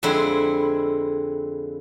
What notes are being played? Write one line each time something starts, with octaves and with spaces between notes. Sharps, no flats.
F2 D3 G#3 C4 E4